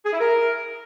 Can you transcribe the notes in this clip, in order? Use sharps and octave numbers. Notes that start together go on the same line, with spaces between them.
G#4
E4
A#4